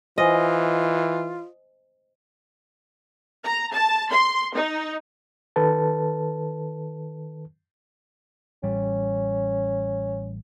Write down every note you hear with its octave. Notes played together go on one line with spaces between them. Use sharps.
E3 F4 C5 D#5 G#5
A#5
A5
C6
D#4
D#3 A4 B4 A5
A1 G3 C#4